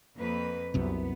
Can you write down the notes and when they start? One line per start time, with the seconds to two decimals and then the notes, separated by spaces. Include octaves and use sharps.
0.17 F2 A#3 B4
0.74 C2 F#2 C3 B3